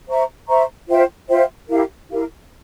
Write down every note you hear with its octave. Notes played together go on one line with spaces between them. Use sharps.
C5 E5 A#5 C#6
C5 E5 A#5 C#6
F4 C5 E5 G5
F4 C5 E5 G5
E4 G4 A#4 F5
E4 G4 A#4 F5